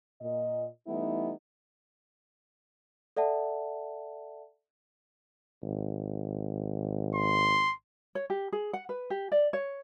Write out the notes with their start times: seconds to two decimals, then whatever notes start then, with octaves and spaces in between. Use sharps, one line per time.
0.21 A#2 D#5
0.87 E3 G3 A3 B3 D#4 E4
3.17 A4 D5 E5 F#5 A5
5.63 G#1
7.15 C6
8.15 C#5
8.30 G4
8.52 G#4
8.73 F#5
8.89 B4
9.10 G4
9.32 D5
9.53 C#5